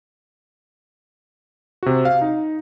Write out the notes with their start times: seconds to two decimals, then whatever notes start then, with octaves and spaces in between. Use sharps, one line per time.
1.83 C3 F#4
2.05 F5
2.21 D#4